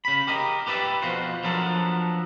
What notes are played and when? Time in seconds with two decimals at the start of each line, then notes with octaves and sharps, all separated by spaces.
0.05 C#3 B5
0.27 G4 A#4 D#5
0.67 G4 B4 D5 E5
1.02 F2 B2 F4 F#4 C5
1.44 D3 F3 F#3 B3 A4 A#4